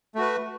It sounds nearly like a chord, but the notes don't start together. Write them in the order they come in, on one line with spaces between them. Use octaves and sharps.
A3 F#4 B4